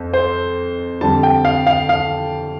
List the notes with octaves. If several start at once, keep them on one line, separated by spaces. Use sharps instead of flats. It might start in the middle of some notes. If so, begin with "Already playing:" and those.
Already playing: F2 C4
C5
F2 D3 G3 C4 A5
G5
F5
F5
F5